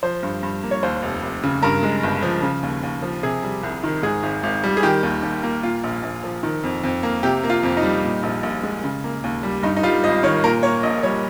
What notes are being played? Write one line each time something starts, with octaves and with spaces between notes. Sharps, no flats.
F3 C5
G2
G2
A#3
C#5
D#2 C5
F1
F1
C#3
G2 A#4
G#3
G1
F3
C#3
D#2
D#2
F3
C3 G#4
G3
C2
D#3
G#2 G#4
G#1
G#1
G3
G#4
D#3 G4
D#2
D#2
A#3
A#2 F4
A#1
A#1
F3
D#3
F2
F2
A#3
C3 G4
A#3
F4
F2
D#4
G3
A#2
A#1
A#1
G#3
C#3
A#3
D#2
G3
G2 D#4
D#4
G3 F4
G#1 D#5
D#3 C#5
A#2 A#4
A#3 C#5
A#1 D#5
G3 C#5